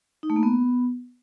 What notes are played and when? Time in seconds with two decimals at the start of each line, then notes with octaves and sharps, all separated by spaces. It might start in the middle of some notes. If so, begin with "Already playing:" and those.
0.23 D#4
0.30 A3
0.36 A#3
0.43 B3